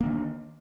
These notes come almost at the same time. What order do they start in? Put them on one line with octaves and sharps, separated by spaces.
A#3 D4 D#3